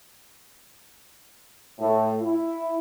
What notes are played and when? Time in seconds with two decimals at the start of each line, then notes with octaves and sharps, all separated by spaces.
1.79 A2
2.22 E4